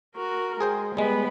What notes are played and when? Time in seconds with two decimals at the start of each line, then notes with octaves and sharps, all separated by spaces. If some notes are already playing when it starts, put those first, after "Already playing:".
0.15 F#4 A#4
0.60 G#3 G#4 C5 G5
0.97 G3 G#3 B3 B4